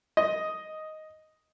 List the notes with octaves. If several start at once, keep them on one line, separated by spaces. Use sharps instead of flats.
D#5